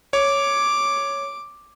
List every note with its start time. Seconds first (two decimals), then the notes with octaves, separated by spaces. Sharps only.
0.13 C#5 D6